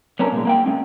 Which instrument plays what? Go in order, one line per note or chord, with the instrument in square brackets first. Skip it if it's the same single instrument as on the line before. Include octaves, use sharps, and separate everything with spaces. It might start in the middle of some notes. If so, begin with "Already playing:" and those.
[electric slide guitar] B3 C#4 D4 A#4
A#2 G#3
A#3 F#5 G5
G#3 C#4